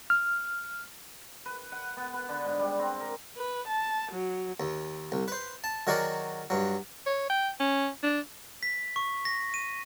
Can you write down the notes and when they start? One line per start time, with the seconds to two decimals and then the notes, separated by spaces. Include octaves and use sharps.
0.10 F6
1.46 B4
1.72 F#5
1.97 B3
2.14 B4
2.29 D3
2.45 G#2
2.59 G3
2.79 C4
3.00 A#4
3.37 B4
3.67 A5
4.12 F#3
4.60 D#2
5.12 C2
5.28 B4 C5
5.64 A5
5.87 D#3 F#3 F#4 G#4 A#4 D5
6.50 G2 F#3
7.06 C#5
7.30 G5
7.60 C#4
8.03 D4
8.63 B6
8.96 C#6
9.25 A#6
9.54 D#7